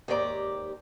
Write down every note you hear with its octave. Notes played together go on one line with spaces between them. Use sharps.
D#2 G#2 G4 D5 A#5